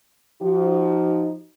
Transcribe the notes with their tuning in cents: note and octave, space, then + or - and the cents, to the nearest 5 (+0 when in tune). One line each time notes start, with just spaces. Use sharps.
F3 +0 D#4 +5 F#4 +40